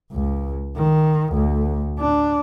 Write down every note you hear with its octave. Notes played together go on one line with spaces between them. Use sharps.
C#2
D#3
D2
D4